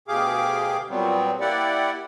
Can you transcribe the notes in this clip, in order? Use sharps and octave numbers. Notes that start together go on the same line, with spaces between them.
D2 B2 G4 G#4 F5 D6
A#2 F#3 G3 B3 C4
A#3 E4 G4 D5 F#5